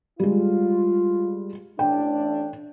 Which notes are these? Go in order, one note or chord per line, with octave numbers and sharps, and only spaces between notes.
G3 G#3 F4
A1 A3 D4 G5